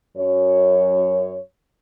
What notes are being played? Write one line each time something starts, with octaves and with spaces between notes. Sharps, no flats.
F#2 C#5